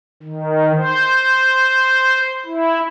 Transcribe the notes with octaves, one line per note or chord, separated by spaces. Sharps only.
D#3
C5
E4